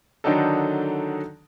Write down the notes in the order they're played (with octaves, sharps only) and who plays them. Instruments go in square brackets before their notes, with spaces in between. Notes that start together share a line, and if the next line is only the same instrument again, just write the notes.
[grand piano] D3 D#3 F#3 D4 D#4 A4